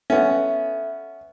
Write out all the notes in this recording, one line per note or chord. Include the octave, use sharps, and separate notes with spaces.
B3 C#4 A4 E5